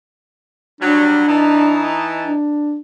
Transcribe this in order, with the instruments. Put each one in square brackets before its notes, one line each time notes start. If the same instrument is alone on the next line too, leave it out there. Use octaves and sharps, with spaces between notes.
[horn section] F#3 G3 [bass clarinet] D4
[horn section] E3 D#4 A5
[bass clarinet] D4